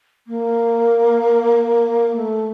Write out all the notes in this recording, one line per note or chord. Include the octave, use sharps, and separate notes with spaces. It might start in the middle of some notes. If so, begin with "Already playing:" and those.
A#3
A3